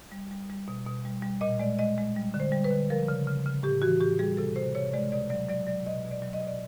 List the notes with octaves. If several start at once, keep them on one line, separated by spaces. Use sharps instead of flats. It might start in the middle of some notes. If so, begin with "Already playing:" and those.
G3
G3
G3
B2
B2
G3
G3
A#2 D#5
G#3 D5
G#3 D#5
G#3
G3
D3
C5
G3
B4
D3
F3 A#4
C#3
C#3
C#3
A2 G4
E3 F#4
A2 G4
G3 G#4
C3 A4
C3 C5
C3 C#5
G#3 D5
B2 D5
F#3 D5
F#3 D5
F#3 D5
B2 D#5
B2
D5
F#3
D#5
B2
D5